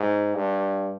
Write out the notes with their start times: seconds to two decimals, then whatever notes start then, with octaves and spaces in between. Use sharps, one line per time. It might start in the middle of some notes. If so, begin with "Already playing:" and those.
Already playing: G#2
0.35 G2